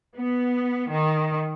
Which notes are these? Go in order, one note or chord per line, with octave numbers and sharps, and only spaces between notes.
B3
D#3